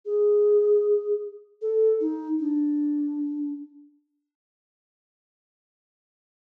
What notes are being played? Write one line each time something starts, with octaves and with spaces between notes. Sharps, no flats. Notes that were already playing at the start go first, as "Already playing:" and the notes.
G#4
A4
D#4
D4